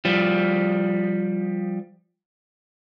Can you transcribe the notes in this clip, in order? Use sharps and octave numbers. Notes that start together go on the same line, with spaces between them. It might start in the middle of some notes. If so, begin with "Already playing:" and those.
F3 G3